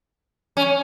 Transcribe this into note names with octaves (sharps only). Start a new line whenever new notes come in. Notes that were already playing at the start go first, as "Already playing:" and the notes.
C#4